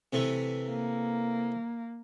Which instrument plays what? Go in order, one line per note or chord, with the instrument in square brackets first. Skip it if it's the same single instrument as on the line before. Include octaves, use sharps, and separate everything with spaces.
[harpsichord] C3 E3 A3
[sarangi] A#3